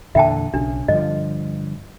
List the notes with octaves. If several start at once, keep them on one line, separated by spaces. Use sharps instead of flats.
E2 A#2 D3 E5 G5 A5
B1 C#3 D4
G2 D3 F3 D#5